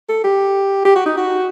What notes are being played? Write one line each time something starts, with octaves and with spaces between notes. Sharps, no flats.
A4
G4
G4
F#4
D#4
F#4